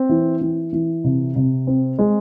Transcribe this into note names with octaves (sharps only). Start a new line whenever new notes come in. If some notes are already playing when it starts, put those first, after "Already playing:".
Already playing: C4
E3
E3
E3
C3
C3
C4
G#3